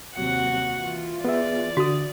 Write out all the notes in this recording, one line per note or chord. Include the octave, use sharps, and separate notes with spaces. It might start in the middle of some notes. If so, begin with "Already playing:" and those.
D#2 C3 F#3 F#4 F#5
E3 F4
B3 G#4 D5 E5
D3 F#4 D#6